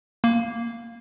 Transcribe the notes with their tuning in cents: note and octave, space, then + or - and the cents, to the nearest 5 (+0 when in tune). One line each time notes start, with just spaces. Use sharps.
A#3 -5